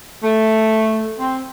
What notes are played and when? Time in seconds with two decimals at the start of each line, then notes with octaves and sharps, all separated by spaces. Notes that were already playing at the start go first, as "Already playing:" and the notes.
0.22 A3
1.18 C4